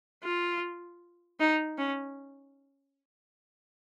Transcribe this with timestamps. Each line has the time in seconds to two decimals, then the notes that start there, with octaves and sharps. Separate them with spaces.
0.24 F4
1.40 D#4
1.78 C#4